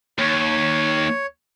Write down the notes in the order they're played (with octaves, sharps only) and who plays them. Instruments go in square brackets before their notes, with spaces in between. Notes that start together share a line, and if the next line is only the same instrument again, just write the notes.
[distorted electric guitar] D#2 [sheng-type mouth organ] C#5